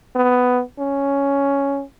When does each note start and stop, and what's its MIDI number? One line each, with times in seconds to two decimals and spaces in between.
0.16 0.62 59
0.79 1.83 61